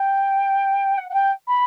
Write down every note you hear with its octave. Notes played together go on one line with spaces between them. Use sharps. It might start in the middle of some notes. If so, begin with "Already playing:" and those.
Already playing: G5
F#5
F#5
G5
B5